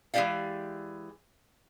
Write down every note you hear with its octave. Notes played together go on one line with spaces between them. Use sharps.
E3 G#3 F#4 G4 D5 F5